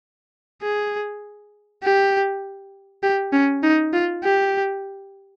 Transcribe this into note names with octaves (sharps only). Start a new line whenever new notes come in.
G#4
G4
G4
C#4
D#4
F4
G4